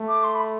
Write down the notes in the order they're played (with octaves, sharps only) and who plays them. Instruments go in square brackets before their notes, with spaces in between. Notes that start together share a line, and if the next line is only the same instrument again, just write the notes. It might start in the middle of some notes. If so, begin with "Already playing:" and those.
Already playing: [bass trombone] A3
[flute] D6
C6
B5